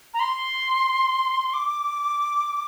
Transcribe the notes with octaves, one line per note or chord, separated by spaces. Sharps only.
A#5
C6
D6